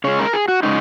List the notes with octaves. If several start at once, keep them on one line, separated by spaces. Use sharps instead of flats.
C#3 G#3 C#4 C#5
A#4
G#4
F#4
C#3 G#3 C#4 D#4